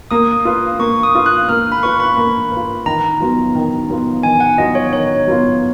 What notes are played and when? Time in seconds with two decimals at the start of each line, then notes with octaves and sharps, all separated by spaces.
0.11 A#3 D#6
0.45 F4 B4
0.79 A#3 C#6
1.03 D#6
1.15 F4 B4
1.26 F#6
1.48 A#3 F6
1.72 B5
1.83 F4 B4 C#6
2.00 B5
2.17 A#3
2.52 F4 B4
2.86 D#3 A#5
3.21 F#3 B3 F4
3.55 D#3
3.89 F#3 B3 F4
4.23 D#3 G#5
4.40 F#5
4.58 F#3 B3 F4 D#5
4.75 C#5
4.92 D#3 C#5
5.27 F#3 B3 F4